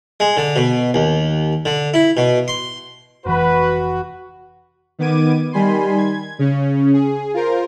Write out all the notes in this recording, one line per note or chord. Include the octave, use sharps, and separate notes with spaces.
G#3
D3
B2
D#2
D3
E4
B2
C6
F1 E3 F#4 B4
D#3 B3 D6 G#6 D#7
D#3 G3 G#5 B5 C6
G#6
C#3 C#4
G#4
F4 A#4 C5